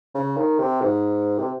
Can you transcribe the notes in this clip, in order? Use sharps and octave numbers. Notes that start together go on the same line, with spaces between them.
C#3
D#3
C3
G#2
C3